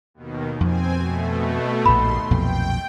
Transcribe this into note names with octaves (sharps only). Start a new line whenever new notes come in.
D#2 B2 D#3
F2 F3 C4 G#5
B2 A3
A#1 D#2 A2 B5 C6
B1 F2 A#2 G5